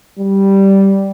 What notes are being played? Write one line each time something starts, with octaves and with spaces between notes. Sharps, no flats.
G3